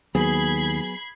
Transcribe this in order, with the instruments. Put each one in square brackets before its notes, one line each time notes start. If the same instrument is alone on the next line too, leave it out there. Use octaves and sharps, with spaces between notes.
[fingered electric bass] D#2 [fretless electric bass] F#3 B3 [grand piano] G#4 [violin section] B5 G#6 C7